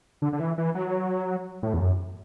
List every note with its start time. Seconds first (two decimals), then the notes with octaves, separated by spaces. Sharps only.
0.22 D3
0.33 D3
0.40 E3
0.58 E3
0.75 F#3
1.63 A2
1.74 E2
1.80 F#2